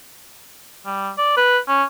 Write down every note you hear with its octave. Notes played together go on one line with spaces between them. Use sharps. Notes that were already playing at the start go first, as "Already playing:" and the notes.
G3
D5
B4
C#4